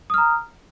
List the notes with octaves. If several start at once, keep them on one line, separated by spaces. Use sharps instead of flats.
A#5 D#6 F6